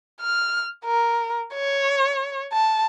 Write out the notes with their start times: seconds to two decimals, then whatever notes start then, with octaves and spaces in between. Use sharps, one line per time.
0.21 F6
0.85 A#4
1.54 C#5
2.53 A5